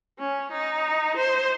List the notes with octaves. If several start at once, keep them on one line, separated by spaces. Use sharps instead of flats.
C#4
D#4
C5